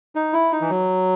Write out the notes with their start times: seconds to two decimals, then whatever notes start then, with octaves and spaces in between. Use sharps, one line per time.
0.15 D#4
0.33 E4
0.52 D#4
0.61 E3
0.70 F#3